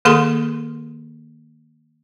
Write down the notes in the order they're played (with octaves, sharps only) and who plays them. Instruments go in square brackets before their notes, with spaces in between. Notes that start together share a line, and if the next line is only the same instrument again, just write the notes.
[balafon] D#3 A#3 G#4 A4 C6